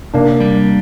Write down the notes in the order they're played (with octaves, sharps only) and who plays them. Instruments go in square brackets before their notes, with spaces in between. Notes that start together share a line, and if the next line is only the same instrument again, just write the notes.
[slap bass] C3 [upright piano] A#3 D4
[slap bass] G3